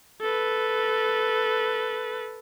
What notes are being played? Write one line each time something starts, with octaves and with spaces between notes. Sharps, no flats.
A4 B4